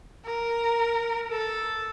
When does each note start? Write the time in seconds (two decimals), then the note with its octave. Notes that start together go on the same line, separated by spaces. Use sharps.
0.25 A#4
1.31 A4